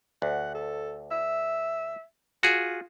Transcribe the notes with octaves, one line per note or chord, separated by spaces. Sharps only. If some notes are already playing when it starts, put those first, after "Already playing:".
D2 F#5
A4
E5
F4 F#4 G#4